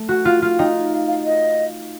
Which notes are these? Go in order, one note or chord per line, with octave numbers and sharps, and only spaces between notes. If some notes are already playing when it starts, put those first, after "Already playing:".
Already playing: A3
F#4
F4
F4
D#4 G5
F5
F5
D#5